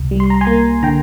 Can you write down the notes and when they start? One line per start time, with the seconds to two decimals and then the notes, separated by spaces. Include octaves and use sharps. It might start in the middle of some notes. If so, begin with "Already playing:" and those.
Already playing: C2
0.11 G3
0.20 C6
0.30 A#5
0.41 G#5 C6
0.47 A#3
0.83 D3 G5 A#5